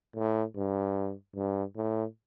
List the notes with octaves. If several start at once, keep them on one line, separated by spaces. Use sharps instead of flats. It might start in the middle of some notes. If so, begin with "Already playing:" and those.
A2
G2
G2
A2